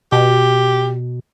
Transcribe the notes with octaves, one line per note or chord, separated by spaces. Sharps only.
B2 G4